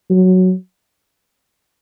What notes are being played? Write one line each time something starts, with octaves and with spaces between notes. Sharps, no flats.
F#3